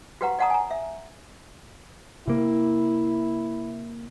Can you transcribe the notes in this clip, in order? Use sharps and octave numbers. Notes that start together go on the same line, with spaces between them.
F#4 G4 B4 F5 F#5 A#5
D5 F5 F#5 A5 A#5 D#6
G#5 A#5
E5
C3 A#3 E4